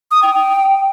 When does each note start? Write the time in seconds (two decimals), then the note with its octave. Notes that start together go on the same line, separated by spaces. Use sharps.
0.11 D#6
0.23 G5
0.34 G5